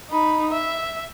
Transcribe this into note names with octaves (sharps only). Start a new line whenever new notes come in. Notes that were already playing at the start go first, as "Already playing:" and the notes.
D#4 B5
E5